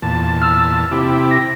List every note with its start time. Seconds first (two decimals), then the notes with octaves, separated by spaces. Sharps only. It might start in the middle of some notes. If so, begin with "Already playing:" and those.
0.02 E2 A#2 A5
0.42 E6 F6
0.91 C3 E4 G4
1.31 A#6